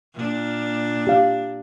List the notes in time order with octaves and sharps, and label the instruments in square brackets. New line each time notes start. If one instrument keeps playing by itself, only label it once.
[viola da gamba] A#2 D4
[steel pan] G4 F5